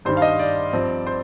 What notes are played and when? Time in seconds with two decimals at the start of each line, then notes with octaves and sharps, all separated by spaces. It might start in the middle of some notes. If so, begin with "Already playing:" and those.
0.05 G2 D#3 G3 D4 C5
0.17 F5
0.22 D#5
0.39 D5
0.73 G2 F3 C4
1.07 C5